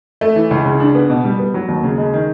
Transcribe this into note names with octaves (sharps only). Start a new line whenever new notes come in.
A3
E3
C#2
C#3
D4
B3
B2
G3
B3
F#3
D#2
C#3
G#3
D#3